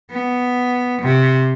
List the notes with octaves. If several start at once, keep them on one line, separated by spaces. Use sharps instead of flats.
B3
C3